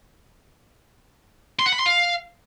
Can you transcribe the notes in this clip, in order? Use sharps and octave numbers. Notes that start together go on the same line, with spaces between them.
C6
F#5
B5
C6
F5